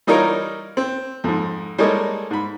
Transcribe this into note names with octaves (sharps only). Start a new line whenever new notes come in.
E3 G3 D#4 F4 A#4 C#5
C4
F2 G#2
G3 G#3 A#3 A4 C#5 D#5
G#2 B5